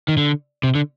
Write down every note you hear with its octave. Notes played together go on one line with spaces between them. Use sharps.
D#3
D3
C3
D3